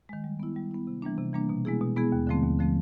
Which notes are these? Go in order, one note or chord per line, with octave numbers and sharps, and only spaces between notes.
D#3 G#3
G3
B3 E4
G3
B3 E4
C3
E3 G3 A#3 D4
C3
E3 G3 A#3 D4
B2
G#3 B3 E4 G#4
B2
G#3 B3 E4 G#4
D#2
D3 F3 A3 C4
D#2
D3 F3 A3 C4